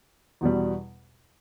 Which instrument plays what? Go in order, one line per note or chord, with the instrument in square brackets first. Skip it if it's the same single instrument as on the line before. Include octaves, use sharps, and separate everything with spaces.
[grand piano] E2 B2 G3